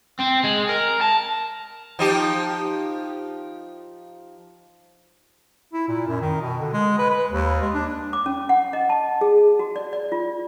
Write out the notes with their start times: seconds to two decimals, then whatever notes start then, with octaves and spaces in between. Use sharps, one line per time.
0.20 C4
0.44 G#3
0.69 A#4
1.01 A5
1.99 F3 D#4 G4
5.73 E4
5.88 A#2
6.07 F#2
6.21 D#3
6.41 B2
6.60 D3
6.73 G#3
6.98 B4
7.10 B4
7.31 D#2
7.61 G#3
7.74 D4
8.13 D6
8.26 C#4
8.49 F#5
8.73 D#5
8.89 A5
9.21 G#4
9.59 F#4
9.76 D5
9.93 D5
10.12 F4